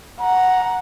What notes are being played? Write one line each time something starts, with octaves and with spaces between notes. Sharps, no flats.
F#5 A#5